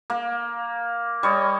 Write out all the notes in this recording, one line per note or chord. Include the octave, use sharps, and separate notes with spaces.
A#3
G3 C#5 D#5